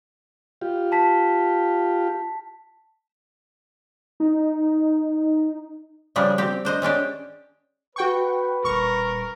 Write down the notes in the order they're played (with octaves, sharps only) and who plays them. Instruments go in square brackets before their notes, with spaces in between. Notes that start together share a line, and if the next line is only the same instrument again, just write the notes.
[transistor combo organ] F4 G4
[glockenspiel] A5 B6
[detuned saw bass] D#4
[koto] C#3 F3 G3 D4 G#4
C4 G4
D4 C5 D#5
G#3 C#4 D4 G4
[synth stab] F#4 G5 C#6 [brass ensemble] B4
[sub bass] D#1 [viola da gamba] A#4 [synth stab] C#6